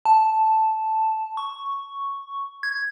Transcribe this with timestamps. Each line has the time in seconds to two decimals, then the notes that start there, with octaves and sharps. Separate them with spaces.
0.05 A5
1.37 C#6
2.63 G#6